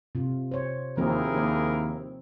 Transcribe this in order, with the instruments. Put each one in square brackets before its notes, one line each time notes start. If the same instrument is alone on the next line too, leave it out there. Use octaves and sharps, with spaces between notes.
[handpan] C3 F4
C5 C#5
[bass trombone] D#2 [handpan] F3 C4 [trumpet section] E4 G#4 A#4
[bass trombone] D#2